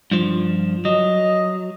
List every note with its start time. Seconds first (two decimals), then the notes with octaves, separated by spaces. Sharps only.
0.11 G2 F3
0.85 F#3 D#5